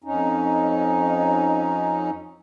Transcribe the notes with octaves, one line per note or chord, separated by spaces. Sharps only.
F2 C#4 D#4